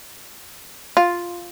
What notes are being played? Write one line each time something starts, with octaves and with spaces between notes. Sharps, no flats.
F4